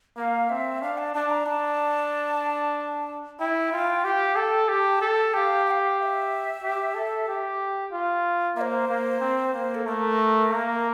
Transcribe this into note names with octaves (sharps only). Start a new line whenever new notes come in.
A#3 F5
C4 E5
D4 F5
A5
D4 A5
A#5
D4 A5
E4 G5
F4
G4 F5
A4 G5
G4 A5
A4
G4 F5 G5
G5
F5
F5
E5
G4
A4
G4
F4
A#3 E5
C5
A#3
C4
A#3
A4
A3 A#4
A#3